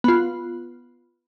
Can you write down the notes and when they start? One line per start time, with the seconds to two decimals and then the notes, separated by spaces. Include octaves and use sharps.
0.04 B3 F4